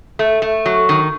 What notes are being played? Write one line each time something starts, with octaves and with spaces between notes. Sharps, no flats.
A3
A3
F#3
D#3